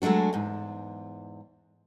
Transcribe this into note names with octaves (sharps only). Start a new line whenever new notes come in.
F#3 G#3 A3 D4 F#4
E2 G#2